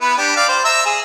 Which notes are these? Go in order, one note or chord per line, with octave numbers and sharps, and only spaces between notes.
B3 E4 B4
D4 G4
D5 F5
C5
E5 A#5 E6
G#4